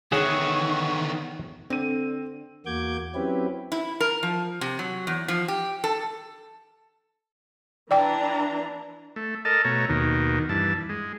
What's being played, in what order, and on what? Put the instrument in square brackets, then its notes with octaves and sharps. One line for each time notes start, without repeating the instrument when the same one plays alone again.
[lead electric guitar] D3 D#3 [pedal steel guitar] B3 E5 F#5 [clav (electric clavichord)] G#4 C#5 [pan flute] C#6
[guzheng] D3 [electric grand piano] C4 D#7
[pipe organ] E2 A#3 F#4 D6 G6 G#6
F#3 C4 C#4 E4 G4 B4
[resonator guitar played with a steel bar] E4
A#4
F3
C3
F#3
E2
F3
G4
A4
[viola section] E3 D4 A#5 [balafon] D5 G5
[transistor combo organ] A3
A4 A#4 D#5 A5
B2 A3 C#5 A#5
D#2 B2 D#3
G2 E3 A5
G#3